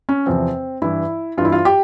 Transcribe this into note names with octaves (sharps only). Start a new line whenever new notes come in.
C#4
E2 C3 F3 C4
G2 E3 E4
G2 E3 E4 F4
F4
G4